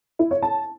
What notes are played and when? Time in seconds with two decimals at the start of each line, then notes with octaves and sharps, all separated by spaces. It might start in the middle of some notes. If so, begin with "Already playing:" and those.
0.19 E4
0.31 C#5
0.42 A5